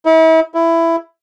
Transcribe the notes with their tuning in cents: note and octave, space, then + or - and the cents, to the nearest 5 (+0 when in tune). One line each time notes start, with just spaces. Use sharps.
E4 -40
E4 +10